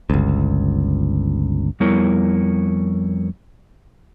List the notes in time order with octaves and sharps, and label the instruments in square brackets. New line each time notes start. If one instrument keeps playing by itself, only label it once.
[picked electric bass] G1 C#2
[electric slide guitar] F2 G3 B3 E4 A#4 C#5